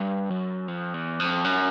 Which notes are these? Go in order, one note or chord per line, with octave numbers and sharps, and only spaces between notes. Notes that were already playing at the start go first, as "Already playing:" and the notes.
Already playing: G2
F#2
F2
E2
F2
F#2